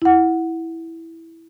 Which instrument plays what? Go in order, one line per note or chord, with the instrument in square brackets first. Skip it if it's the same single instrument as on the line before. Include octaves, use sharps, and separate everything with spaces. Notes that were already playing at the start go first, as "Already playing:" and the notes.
[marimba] E4 F#5